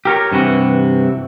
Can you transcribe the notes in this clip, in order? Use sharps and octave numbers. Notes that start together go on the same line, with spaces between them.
G4 A#4 C#5
G2 C3 E3 F#4